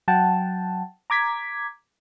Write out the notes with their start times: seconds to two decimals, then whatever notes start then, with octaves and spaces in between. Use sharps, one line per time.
0.08 F#3 F#5 G5 A5
1.10 A#5 D6 G#6 B6